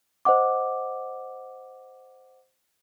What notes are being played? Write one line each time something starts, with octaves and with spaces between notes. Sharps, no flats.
C5 D#5 F#5 D6